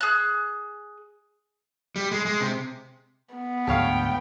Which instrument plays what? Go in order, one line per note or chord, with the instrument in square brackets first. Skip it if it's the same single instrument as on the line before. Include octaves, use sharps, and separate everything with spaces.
[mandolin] G#4 F#6
[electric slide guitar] G3
G#3
G#3
C3
[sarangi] B3
[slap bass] G#1 D2 [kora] A4 C#5 F5 [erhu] G5